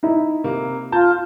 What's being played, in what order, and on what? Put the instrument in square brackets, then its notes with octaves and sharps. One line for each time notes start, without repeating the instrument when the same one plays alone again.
[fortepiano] D#4 E4
[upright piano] C3 A#3
[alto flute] F4 [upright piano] A5 G6